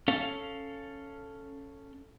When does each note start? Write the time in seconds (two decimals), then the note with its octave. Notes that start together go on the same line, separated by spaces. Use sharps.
0.08 C#4 A4 F5